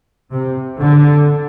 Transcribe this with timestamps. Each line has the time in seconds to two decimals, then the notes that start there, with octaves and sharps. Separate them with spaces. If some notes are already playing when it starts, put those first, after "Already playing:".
0.32 C3
0.79 D3